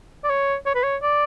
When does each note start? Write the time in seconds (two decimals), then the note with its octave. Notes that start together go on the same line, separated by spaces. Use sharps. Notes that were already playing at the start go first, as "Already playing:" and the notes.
0.24 D5
0.29 C#5
0.66 C#5
0.75 B4
0.83 C#5
1.03 D5